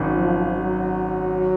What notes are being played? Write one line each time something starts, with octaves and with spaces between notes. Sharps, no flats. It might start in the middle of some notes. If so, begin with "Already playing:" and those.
Already playing: G#1 F#2 D#3
F3
F#3